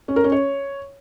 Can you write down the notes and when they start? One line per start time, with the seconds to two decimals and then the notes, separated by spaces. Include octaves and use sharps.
0.08 C#4
0.16 A#4
0.24 C#4
0.32 C#5